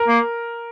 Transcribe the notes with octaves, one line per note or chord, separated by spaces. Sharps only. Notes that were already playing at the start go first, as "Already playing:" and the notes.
Already playing: A#4
A#3